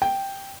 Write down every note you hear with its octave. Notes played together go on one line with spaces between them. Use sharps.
G5